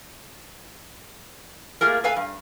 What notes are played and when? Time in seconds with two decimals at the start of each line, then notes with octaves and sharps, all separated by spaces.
1.81 A3 A#3 F4 G#4 A#4
2.04 A4 B4 F5 G#5
2.16 G2